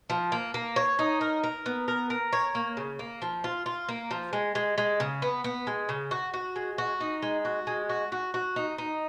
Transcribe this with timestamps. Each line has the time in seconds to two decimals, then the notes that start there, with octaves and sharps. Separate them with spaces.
0.10 F3
0.32 A#3
0.54 A#3
0.76 C#5
0.99 D#4
1.21 A#4
1.43 A#4
1.66 B3
1.88 A#4
2.10 A#4
2.33 C#5
2.55 A#3
2.77 C#3
2.99 A#3
3.22 F3
3.44 F4
3.66 F4
3.89 A#3
4.11 F3
4.33 G#3
4.55 G#3
4.78 G#3
5.00 C#3
5.22 B3
5.44 B3
5.67 G#3
5.89 C#3
6.11 F#4
6.34 F#4
6.56 G#3
6.78 F#4
7.01 D#4
7.22 G#3
7.45 F#4
7.67 G#3
7.89 F#4
8.12 F#4
8.34 F#4
8.56 D#4
8.78 D#4